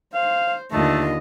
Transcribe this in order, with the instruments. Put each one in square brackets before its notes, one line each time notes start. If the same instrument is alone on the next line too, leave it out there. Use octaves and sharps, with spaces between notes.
[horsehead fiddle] C5 [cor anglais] F5
[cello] D#2 D3 [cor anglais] A3 [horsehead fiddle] F4 D#5